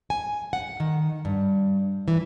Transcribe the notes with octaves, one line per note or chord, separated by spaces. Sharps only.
G#5
F#5
D#3
G2
E3